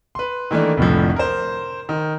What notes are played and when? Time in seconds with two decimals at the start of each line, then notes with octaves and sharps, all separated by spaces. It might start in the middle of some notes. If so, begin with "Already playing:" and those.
0.15 B4 C6
0.51 D#3 E3 A3 A#3 D4
0.77 F1 C2 A2 D3 F3
1.16 A#4 C5
1.89 D#3